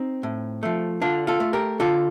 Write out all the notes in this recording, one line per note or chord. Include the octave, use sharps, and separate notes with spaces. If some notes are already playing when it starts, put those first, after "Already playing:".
Already playing: C4 D#4
A2
F3 A3
D3 D4 F4
F4 A4
A3
G4 A#4
D3 F4 A4